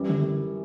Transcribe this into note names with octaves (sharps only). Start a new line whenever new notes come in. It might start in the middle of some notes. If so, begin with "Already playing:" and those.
Already playing: F#2 E3 G3 C#4
D3